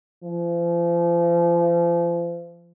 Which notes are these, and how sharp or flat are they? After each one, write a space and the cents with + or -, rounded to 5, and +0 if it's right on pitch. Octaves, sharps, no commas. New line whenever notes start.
F3 -35